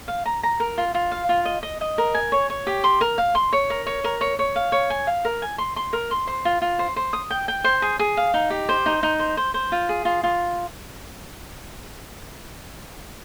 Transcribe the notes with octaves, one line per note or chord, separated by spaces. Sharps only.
F5
A#5
A#5
A#4
F4
F4
F5
F4
D#5
D#5
D#5
A#4
G#5
C#5
C#5
G4
C6
A#4
F5
C6
C#5
A#4
C#5
A#4
C#5
C#5
F5
C#5
G#5
F5
A#4
G#5
C6
C6
A#4
C6
C5
F4
F4
C5
C5
D#6
G5
G5
C5
G#4
G#4
F5
D#4
G4
C5
D#4
D#4
C5
C5
C5
F4
G#4
F4
F4